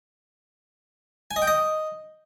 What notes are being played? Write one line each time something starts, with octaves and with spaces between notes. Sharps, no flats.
G#5
D#5
G5
D#5